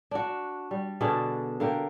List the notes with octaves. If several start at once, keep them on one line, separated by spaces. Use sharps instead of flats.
D4 F#4
G3
B2 D3 D4 G#4
D3 A#3 G4 G5